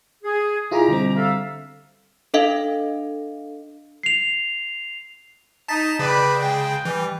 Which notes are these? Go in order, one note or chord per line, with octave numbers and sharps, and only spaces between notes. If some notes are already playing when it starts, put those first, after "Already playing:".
G#4
B2 E4 F4 G4 G#4 A#5
D3 G3 C4
A4 E5 F5
D4 A4 D#5 F5
C7 F7
D#4 A5 A6 B6
C#3 B4 D5 G5
G#3 G5
E3 G3